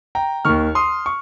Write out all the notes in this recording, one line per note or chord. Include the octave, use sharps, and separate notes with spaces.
G5 A#5
D#2 D#3 C#6 F6
C6 D#6
C#6